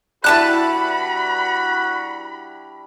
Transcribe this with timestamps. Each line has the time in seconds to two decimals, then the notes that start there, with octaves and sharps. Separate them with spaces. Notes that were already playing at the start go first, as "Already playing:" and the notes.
0.24 G3 D4 E4 F#4 B4 A5 B5 F#6